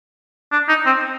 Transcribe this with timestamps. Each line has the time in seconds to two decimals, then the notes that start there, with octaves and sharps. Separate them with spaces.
0.52 D4
0.68 D#4
0.86 C4